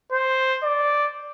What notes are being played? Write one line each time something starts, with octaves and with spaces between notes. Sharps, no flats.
C5
D5